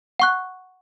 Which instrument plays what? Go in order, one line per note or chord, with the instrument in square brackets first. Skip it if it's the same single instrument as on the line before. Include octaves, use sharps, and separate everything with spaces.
[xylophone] F#5 C#6 F#6